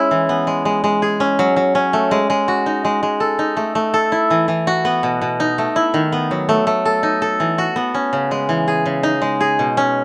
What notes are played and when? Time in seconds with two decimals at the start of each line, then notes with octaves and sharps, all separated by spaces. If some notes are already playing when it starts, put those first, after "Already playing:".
Already playing: G#3 C#4 E4
0.11 E3
0.29 B3
0.47 G#3
0.65 G#3
0.84 G#3
1.02 G#4
1.20 C#4
1.39 F#3
1.56 F#3
1.75 C#4
1.93 A3
2.11 G#3
2.30 G#3
2.48 F#4
2.66 D#4
2.85 G#3
3.03 G#3
3.20 A4
3.39 D#4
3.57 A3
3.75 A3
3.94 A4
4.12 E4
4.30 E3
4.48 E3
4.67 F#4
4.85 B3
5.03 B2
5.22 B2
5.40 D#4
5.58 A3
5.76 E4
5.94 D#3
6.12 B3
6.31 F#3
6.49 A3
6.67 A3
6.85 A4
7.03 D#4
7.22 A4
7.40 E3
7.58 F#4
7.76 B3
7.94 C#4
8.13 C#3
8.31 G#3
8.49 E3
8.68 G#4
8.86 C#3
9.03 D#4
9.22 G#3
9.40 G#4
9.59 B2
9.77 C#4